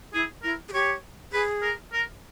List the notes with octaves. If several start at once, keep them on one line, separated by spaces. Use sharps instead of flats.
E4 G#4
E4 A#4
G#4
G4 C#5
G#4 B4
A#4
A#4